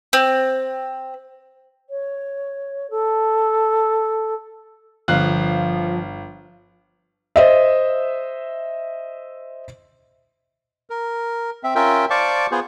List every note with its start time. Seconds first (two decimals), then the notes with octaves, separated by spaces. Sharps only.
0.13 C4
1.89 C#5
2.90 A4
5.08 G1 F3 F5 F#6
7.36 C5 D#5 E5
10.90 A#4
11.64 C4 E5
11.75 C#4 F4 A#4 E5 G5
12.10 C5 D5 F5 A5 C#6 D6
12.51 B3 F4 G#4 C5